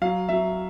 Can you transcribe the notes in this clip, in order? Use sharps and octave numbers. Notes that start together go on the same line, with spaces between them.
F#3 F5
F#3 E5